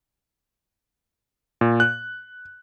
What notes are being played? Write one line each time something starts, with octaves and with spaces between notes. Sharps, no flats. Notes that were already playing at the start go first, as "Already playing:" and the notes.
A#2
F#6